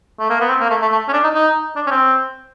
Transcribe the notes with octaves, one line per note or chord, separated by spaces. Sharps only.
A3
A#3
B3
C4
A#3
A3
A3
A3
C#4
D4
D#4
D#4
D4
C#4
C4